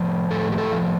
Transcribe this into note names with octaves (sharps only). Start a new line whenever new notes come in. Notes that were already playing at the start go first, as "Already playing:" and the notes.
Already playing: A2 F3
A2 A4
G4
A4
F3